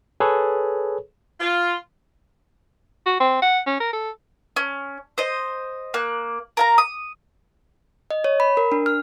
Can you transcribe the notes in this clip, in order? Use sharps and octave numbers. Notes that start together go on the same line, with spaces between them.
G#4 A4 B4 C#5
F4
F#4
C4
F#5
C#4
A#4
A4
C#4
C5 D#5
A#3 F#6
A#4 F5 A#5
D#6
D#5
C#5
B5
A#4
D4
F6